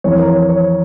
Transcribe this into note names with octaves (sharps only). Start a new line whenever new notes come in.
F2 E3 C#5
A#4
C#5
C#5